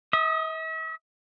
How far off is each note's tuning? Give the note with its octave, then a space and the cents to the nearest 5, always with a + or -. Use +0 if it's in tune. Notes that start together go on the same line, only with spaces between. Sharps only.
E5 -45 D#6 +0